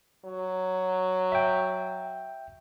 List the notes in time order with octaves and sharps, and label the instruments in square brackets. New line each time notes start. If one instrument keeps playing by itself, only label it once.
[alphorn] F#3
[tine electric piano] E5 G5